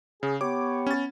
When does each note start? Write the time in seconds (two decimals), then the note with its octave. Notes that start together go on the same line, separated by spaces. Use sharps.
0.23 C#3 G#4
0.41 B3 G4 C#5 D6
0.87 C#4 A6